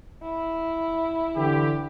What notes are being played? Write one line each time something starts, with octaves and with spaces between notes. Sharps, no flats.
E4
D3 E3 G4